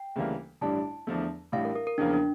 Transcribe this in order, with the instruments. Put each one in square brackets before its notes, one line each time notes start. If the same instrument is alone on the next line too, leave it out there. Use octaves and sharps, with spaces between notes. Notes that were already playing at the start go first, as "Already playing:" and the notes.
Already playing: [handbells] G5
[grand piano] D2 C#3 E3 G3 A#3
[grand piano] A1 G2 D3 G3 D4 [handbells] A5
[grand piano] E2 D3 F3 A3
[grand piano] A1 A2 G3 D4 [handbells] F5
[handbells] A#4
A#4
A#4
[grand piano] E2 C#3 F3 A#3 [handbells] D4
[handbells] D4